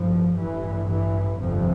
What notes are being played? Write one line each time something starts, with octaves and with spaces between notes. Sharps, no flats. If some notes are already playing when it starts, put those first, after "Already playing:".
Already playing: A1 G2 F3
A1 G2 E3
E3
G1 F2 C3 F3